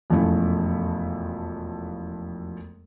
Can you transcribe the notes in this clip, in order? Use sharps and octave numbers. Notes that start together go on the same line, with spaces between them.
E1 F2 F3 A3 C#4 E4